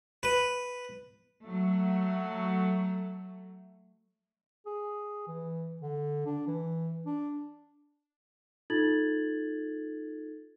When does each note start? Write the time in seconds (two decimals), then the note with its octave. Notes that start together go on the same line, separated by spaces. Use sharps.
0.23 B4
1.43 F#3 A3
4.66 G#4
5.27 E3
5.82 D3
6.26 D4
6.48 E3
7.06 D4
8.70 D#4 F4 A4 G#6 A6 F#7